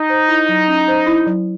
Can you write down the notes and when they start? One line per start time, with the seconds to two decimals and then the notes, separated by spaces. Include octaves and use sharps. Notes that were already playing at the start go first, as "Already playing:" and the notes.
Already playing: D#4
0.10 C5
0.28 E4
0.49 F#3
0.68 C#4
0.88 C5
1.07 E4
1.26 F#3